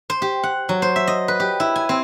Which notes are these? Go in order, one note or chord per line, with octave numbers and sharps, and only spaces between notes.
C5
G4
F#5
F#3
C5
E5
D#5
B4
G4
E4
G#5
C4